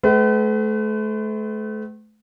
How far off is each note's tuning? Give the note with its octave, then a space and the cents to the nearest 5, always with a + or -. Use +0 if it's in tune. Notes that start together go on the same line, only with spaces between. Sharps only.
A3 -35 B4 +40 F#5 +45